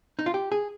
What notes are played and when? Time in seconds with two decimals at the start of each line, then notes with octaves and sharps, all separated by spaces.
0.19 D#4
0.26 F4
0.34 G4
0.52 G#4